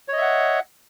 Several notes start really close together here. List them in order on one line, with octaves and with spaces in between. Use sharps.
C#5 D#5 E5 F#5